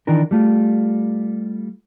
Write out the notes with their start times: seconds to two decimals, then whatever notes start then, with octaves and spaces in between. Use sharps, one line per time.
0.07 D#3 E3 D4 A#4
0.31 G3 A3 F4